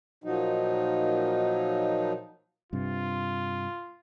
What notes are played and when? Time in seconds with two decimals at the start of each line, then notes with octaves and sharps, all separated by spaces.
0.24 A#2 F3 F#3 D#4
2.73 G2 C3 F4